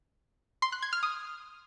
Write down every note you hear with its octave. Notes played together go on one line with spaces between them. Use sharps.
C6
F#6
G#6
F6
D#6